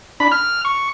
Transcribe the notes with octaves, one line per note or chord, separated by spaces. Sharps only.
D4 B5
F6
C#6